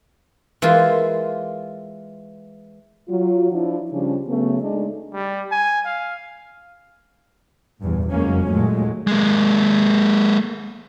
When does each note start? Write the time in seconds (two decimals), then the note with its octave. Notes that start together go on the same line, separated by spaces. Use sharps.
0.62 E3 G#3 A#3 F4
3.09 F#3 F4
3.52 F3 D4 E4
3.91 C#3 F3 G3 C#4 D4
4.27 C#3 F#3 A3 B3
4.62 G#3 A3 D4 D#4
5.14 G3
5.51 G#5
5.85 F5
7.80 E2 G2 A#2
8.10 F#1 F2 F#3 G#3 A#3 C#4
8.48 D#2 A#2 F#3 G#3 A3
9.07 G#3 A#3